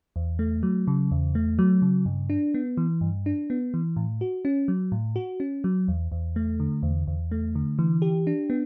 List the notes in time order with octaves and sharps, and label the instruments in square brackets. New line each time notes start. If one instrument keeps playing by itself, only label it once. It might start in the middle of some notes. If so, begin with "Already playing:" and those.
[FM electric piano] E2
A3
F#3
C#3
E2
A3
F#3
C#3
G2
D4
B3
E3
G2
D4
B3
E3
A2
F#4
C#4
F#3
A2
F#4
C#4
F#3
E2
E2
A3
D3
E2
E2
A3
D3
E3
G4
D4
B3